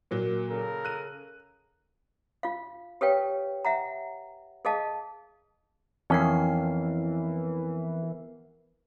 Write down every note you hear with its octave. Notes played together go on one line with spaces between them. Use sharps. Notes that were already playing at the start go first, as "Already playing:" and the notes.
A#2 F#3 A#3
C#3 A4 A#4
F#6 D#7
F4 F5
G4 A4 B4 C#5 F5 G5
E5 F#5 A#5
G#4 A4 D#5 F5 A5
F2 E3 B3 C#4 A#4 C7